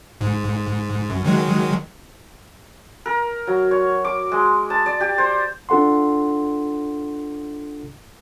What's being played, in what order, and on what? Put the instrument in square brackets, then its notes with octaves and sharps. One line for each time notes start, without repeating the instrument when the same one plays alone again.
[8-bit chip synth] G#2
F#2
D#3 F#3 G#3
[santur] A#4
F#3
C#5
D6
G#3
A5
D5
G4
C5
[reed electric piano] D4 F4 A4 F#5 C6